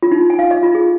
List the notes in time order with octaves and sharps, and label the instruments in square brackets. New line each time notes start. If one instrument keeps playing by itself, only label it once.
[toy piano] F4
D#4
G#5
F5
D#5
F4
G#4